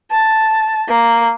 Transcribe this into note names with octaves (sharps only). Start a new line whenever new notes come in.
A5
A#3